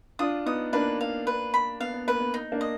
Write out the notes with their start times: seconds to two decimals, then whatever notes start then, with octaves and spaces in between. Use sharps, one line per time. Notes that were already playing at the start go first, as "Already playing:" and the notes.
0.19 D4 F4 D#6
0.46 B3 D#4 D#6
0.73 A#3 D4 B4
1.01 F5
1.27 B4
1.54 B5
1.80 B3 F5
1.94 B3
2.08 A#3 B4
2.20 B3
2.34 D#4
2.52 A#3 D4
2.61 D#5